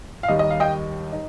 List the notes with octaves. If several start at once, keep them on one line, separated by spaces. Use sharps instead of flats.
F5
D#2 D#3 G3 D#4 D#5
D#5
F5
D#5 G5
D#4